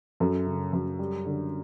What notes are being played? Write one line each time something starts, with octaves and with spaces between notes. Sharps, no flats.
F#2 A4
C#3
F#2
G3
D3